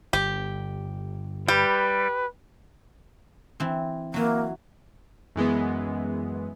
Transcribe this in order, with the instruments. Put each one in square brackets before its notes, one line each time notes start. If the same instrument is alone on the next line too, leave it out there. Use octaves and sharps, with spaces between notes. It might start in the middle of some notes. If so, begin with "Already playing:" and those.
[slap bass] G1 [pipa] G4
[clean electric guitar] G3 [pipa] G4 [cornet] B4
[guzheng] E3 C4
[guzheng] E3 F#3 [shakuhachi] A#3
[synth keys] F#2 E3 G#3 B3